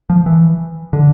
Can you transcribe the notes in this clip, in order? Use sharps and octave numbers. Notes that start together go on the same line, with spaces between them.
F3
E3
D3